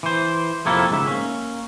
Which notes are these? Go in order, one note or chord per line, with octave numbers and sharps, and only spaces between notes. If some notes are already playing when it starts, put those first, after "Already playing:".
E3 C5
F2 C3 A#3 C#4 E4 A4
C#2 G#2 D#3 E5
A#3 C#4